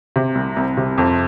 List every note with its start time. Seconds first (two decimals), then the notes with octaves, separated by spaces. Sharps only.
0.16 C3
0.35 C2
0.57 C2
0.77 C3
0.98 F2